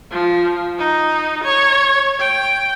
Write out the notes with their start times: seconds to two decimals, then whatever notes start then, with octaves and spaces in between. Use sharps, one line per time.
0.11 F3
0.79 D#4
1.44 C#5
2.20 G5